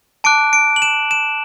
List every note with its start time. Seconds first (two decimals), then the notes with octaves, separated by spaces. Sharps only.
0.24 A5 D6 F#6 D7
0.53 D7
0.76 F#7
0.82 E7
1.11 E7